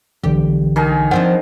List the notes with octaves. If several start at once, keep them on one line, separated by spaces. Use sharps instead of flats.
B1 D3 E3 G4
D#3 G#4 A#4
F3 C4 D4 F#5